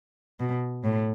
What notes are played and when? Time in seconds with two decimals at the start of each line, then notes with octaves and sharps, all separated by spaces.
0.40 B2
0.84 A2